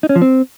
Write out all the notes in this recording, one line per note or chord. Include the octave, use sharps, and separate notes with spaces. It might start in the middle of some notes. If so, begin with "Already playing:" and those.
D#4
C#4
F3
C4